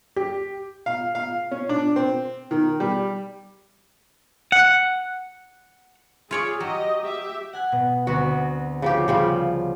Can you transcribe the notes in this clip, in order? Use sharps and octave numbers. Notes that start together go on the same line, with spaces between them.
G4
F5
F5
C#4
D4
C4
D#3
G3
F#5
F4 G#4 C#5 D5
F#3 G4 D#5
G4 E5
F#5 G#5 F#6
B2 B3
D2 B3 C4 F#4
C#3 F3 G4
C#3 F3 G3